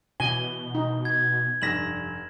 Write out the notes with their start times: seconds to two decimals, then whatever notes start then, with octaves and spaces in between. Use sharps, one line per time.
0.20 B2 E3 G#5 G7
0.75 D#4
1.05 G#6
1.62 F1 G2 A#6 B6 E7 F#7